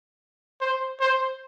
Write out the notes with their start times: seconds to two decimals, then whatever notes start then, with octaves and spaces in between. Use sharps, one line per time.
0.61 C5
1.00 C5